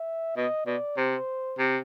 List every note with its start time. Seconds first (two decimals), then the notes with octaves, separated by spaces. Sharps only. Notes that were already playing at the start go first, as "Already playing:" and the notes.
Already playing: E5
0.37 B2 D#5
0.67 B2 D5
0.97 C3 C5
1.59 C3